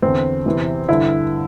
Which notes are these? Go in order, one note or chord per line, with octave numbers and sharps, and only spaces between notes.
E2 D3 C4
E2 C3 E3
G2 D3 E4